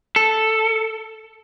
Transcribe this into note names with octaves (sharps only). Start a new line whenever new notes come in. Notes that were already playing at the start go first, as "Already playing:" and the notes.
A4